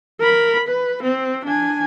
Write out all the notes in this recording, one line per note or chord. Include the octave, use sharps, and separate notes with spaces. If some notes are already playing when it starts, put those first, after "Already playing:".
A#4 B5
B4
C4
D4 G#5